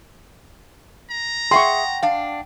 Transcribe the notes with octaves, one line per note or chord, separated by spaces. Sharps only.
A#5
G#4 E5 F#5 G5 C6 C#6
D4 F5